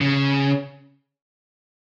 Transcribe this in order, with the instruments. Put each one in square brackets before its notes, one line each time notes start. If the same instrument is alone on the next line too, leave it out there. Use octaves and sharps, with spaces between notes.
[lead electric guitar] C#3